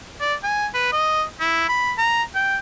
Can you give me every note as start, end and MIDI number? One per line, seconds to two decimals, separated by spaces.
0.21 0.35 74
0.43 0.67 80
0.74 0.88 71
0.92 1.24 75
1.40 1.67 64
1.69 1.93 83
1.98 2.23 82
2.35 2.59 79